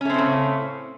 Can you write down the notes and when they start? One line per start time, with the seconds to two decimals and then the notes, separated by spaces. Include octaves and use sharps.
0.01 C#4
0.05 A3
0.10 C4
0.14 A2
0.18 C#3